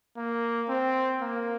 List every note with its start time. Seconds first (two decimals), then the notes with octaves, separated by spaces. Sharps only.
0.16 A#3
0.69 C4
1.21 A#3